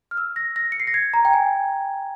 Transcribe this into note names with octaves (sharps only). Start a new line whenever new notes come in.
F6
E6
A#6
A#6
C#7
C7
A#6
G#6
A#5
G5
G#5